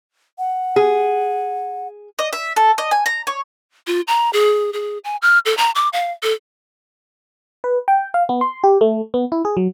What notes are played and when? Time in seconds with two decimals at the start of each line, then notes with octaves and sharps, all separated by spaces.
0.38 F#5
0.76 G#4
2.19 D#5
2.33 E5
2.56 A4
2.78 D#5
2.91 G#5
3.06 A#5
3.27 C#5
3.87 F4
4.08 A#5
4.33 G#4
4.73 G#4
5.04 G#5
5.22 F6
5.46 A4
5.57 A#5
5.75 D6
5.93 F5
6.23 A4
7.64 B4
7.88 G5
8.14 F5
8.29 B3
8.41 C6
8.64 G4
8.81 A3
9.14 B3
9.32 E4
9.45 G#4
9.57 F#3